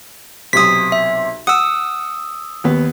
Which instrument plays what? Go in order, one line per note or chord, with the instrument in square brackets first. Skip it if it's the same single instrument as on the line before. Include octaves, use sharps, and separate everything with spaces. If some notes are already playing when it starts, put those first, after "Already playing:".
[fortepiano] B1 C3 [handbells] D#6 B6
[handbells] E5
[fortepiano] F#5 [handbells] D#6 E6
[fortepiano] D#2 B3